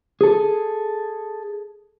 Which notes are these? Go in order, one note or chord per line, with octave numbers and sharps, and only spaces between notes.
G#4 A4